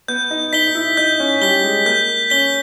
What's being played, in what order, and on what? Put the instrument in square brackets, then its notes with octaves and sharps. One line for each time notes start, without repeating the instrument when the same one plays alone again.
[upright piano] B3 [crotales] G6
[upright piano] D#4
[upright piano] D#4 [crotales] B6 G7
[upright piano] D#4
E4
[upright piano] D#4 [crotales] G6
[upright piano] C#4
[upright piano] G3 [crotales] B6 G7
[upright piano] G#3
[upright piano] A#3 [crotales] G6
[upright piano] C#4 [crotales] B6 G7